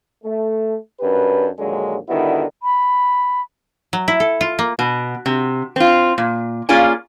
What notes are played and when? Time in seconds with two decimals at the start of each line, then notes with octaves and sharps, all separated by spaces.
0.24 A3
1.00 F#2 D4 G4 B4
1.59 A#1 D#2 D3 F#3 G#3
2.09 D3 D#3 G3 B3 E4 F#4
2.63 B5
3.93 F#3
4.08 E4
4.20 A4
4.41 F4
4.59 A#3
4.79 B2
5.26 C3
5.76 C4 F4
6.18 A#2
6.69 A#3 C#4 F4 G#4 D5 G#5